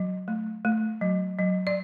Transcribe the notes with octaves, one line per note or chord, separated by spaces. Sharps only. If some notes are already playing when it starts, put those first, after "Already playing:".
Already playing: F#3
A3
A3
F#3
F#3
D5